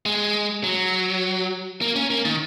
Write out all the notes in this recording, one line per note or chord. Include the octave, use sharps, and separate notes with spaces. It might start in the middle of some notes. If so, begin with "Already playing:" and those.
G#3
F#3
A#3
C#4
A#3
D#3